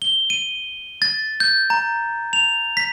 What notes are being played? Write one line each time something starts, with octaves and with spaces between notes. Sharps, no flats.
G7
D#7
A6
G6
A#5
F7
B6